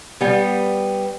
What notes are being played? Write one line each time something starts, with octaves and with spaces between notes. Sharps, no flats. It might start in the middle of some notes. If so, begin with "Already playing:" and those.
G3 B3